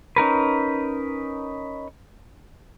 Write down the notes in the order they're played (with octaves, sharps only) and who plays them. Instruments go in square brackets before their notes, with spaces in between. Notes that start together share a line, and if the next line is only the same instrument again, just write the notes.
[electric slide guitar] C#4 D#4 A#4 B4